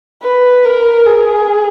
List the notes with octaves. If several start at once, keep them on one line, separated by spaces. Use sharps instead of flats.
B4
A#4
G#4